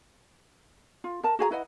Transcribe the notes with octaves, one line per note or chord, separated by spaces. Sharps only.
F4
A#4 A5
F#4 G#4 G#5 A#5
E4 B4 D#5 F#5